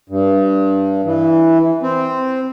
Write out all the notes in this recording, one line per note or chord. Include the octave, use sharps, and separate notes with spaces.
G2
E3
C4